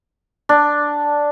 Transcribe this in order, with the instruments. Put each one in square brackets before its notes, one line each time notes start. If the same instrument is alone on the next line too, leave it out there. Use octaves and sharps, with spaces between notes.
[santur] D4